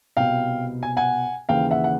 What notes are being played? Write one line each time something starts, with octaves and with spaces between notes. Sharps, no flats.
C2 B2 F5 G5
G#5
F#5 G#5
D#2 C#3 E3 F5 G5
E5 F#5
F#5